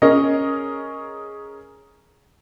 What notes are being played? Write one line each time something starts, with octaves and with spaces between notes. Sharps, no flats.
C#4 G#4 A#4 C#5 D#5